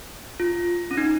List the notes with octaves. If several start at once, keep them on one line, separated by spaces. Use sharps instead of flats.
F4
C#4
D#4